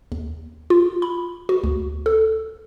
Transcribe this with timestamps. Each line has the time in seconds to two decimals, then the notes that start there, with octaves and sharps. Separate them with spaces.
0.12 D#2
0.70 F4
1.02 B5
1.49 F#4
1.64 D2
2.06 A4